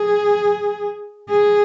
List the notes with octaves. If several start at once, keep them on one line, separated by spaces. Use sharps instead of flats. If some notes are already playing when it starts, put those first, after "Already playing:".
Already playing: G#4
G#4